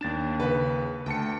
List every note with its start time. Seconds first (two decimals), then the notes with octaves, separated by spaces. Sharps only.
0.01 D#2 D4 A6 E7
0.40 C#3 B4
1.06 D2 G5 A5 C#7